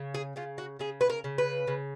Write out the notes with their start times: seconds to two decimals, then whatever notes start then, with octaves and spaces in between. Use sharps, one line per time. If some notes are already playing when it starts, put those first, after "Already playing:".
Already playing: C#3
0.14 G#4
0.36 C#3 F4
0.58 F#4
0.79 C#3 G#4
1.01 B4
1.10 A#4
1.24 C#3
1.38 B4
1.67 C#3